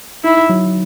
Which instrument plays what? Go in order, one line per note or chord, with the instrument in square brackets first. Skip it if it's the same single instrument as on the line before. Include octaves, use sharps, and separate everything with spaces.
[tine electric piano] D#4 [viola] E4
[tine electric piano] F#3